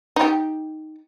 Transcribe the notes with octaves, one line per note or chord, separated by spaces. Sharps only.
D#4 G4